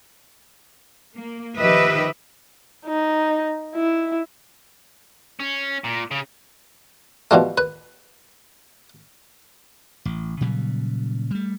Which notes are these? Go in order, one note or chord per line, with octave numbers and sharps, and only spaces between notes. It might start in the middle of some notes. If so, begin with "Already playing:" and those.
A#3
D#3 F3 G4 B4 D#5 E5
D#4
E4
C#4
A#2
C#3
B2 F3 G3 A3
B4
A1
A#2 C#3 F#3 G3
G3 A3